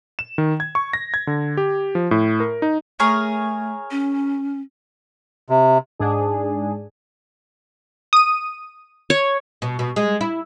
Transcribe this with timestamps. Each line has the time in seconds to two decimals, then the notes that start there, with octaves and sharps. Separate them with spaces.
0.19 E7
0.38 D#3
0.60 G#6
0.75 C#6
0.93 A#6
1.14 G#6
1.27 D3
1.57 G4
1.95 F3
2.11 A2
2.40 A#4
2.62 D#4
3.00 A3 G#4 A#4 C#5
3.91 C#4
5.50 C3
6.00 G#2 D4 G#4
8.13 D#6 D#7
9.10 C#5
9.62 B2
9.79 B2
9.96 G#3
10.21 E4